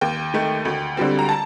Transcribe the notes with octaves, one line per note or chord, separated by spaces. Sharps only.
D#2 G5
D#3 A3
D2
D3 G3 C4
A#5
A5